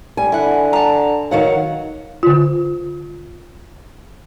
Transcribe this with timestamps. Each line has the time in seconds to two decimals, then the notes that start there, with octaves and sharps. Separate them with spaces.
0.17 G3 G#5
0.32 D3 E4 F#5
0.73 A5 A#5
1.31 D#3 F#3 F5 F#5
2.23 D3 F4